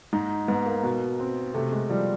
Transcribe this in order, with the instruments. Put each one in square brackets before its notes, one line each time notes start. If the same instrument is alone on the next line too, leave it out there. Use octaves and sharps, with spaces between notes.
[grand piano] G#2 [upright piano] D#4
[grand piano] G#2 [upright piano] B3
[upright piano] A#3
[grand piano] B2
C4
[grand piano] C3 [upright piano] A3
[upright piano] G#3
[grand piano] F3 [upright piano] G3